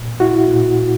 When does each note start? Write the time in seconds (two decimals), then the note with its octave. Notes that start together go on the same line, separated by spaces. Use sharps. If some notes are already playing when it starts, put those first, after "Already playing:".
Already playing: A#2
0.20 E4 F#4
0.48 A#2